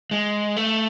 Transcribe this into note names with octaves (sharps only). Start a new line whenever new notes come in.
G#3
A3